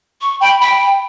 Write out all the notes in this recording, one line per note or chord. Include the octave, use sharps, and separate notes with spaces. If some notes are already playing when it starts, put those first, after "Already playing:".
C#6
G5 B5
G5 B5